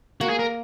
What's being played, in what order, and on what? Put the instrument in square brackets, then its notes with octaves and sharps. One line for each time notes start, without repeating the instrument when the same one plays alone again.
[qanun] A#3 [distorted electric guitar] F#4
[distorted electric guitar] G#4
A#4